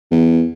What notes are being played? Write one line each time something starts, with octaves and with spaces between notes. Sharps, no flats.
E2